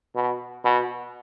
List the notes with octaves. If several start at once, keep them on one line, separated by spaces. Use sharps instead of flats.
B2
B2